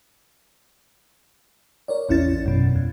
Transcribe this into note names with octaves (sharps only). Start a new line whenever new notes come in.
A#4 C#5 D5
A1 E2 C#4 E4 A6
F#2 B2
F2